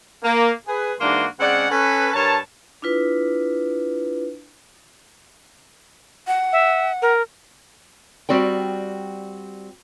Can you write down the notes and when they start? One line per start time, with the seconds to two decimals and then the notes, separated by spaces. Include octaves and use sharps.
0.23 A#3
0.67 G#4 B4
1.00 G#2 E3 A#3 D4 F#4 C6
1.40 C#3 G#3 C4 D5 F#5
1.71 C#4 A4 B4
2.13 G2 A#4 C#5 A5
2.82 D4 E4 F4 B4
6.27 F#5
6.53 E5
7.02 A#4
8.29 G3 C4 F#4 D5 G5